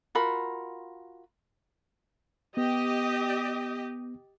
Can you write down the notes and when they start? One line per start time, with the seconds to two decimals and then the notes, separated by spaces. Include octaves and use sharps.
0.15 F4 F#4 A#4 B5
2.57 B3 G4 D#5